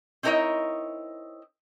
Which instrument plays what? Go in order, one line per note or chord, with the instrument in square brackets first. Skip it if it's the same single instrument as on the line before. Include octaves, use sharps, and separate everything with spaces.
[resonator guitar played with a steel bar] C4 D#4 E4 A#4 C#5 D#5